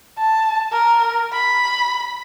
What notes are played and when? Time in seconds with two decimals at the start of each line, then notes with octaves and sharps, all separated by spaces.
0.18 A5
0.72 A#4
1.33 B5